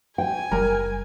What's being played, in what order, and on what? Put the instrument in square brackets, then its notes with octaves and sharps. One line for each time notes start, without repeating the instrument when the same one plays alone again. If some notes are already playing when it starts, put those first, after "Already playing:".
[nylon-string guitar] G5 [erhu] G#5
[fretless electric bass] F#1 G3 [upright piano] A#4